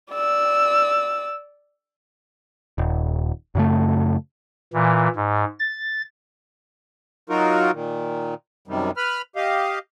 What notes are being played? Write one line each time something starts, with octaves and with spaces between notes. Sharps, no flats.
D5 E6
D#1
F#2 C#3 A3
A#2 E3
G#2
A6
F#3 D#4 F4 F#4 A#4
A#2 D#3
F#2 C3 D#3 G3
B4 B5 F6
G4 D#5 F5